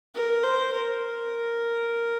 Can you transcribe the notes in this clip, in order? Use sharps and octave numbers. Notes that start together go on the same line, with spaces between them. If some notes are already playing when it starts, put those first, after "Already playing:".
A#4
C5
A#4